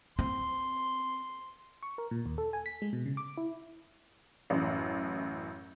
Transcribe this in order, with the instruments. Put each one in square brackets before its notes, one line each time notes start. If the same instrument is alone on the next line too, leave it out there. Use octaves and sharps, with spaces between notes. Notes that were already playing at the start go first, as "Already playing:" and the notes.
[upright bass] C4 [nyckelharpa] C6
[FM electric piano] C#6
A#4
A#2
D#2
A4
G#5
B6
G#3
B2
C#3
D6
E4
[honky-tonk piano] A1 F#2